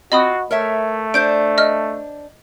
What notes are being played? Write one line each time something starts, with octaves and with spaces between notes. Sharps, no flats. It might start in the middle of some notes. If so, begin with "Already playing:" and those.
C4 F4 F#4 D#5 B5 D#6
A3 A#4 C#5 E5
D4 C5 G6 D7
D#5 F6